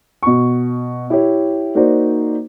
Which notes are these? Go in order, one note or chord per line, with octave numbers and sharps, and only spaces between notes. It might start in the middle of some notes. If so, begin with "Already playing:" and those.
B2 C#6
E4 G4 C#5
A#3 D#4 F#4 C5 D5